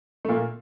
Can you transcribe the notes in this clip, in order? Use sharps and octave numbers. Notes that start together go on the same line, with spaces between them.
A3
A#2 A#3